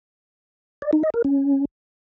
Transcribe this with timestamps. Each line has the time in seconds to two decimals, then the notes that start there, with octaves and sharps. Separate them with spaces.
0.82 D5
0.93 D#4
1.03 D#5
1.14 A#4
1.24 C#4